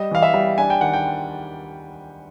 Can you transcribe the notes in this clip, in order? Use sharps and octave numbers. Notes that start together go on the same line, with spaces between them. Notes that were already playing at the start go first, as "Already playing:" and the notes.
Already playing: G3 D#5
E3 F5
E5
G3
D4 G#5
G5
D#3 F#5
G5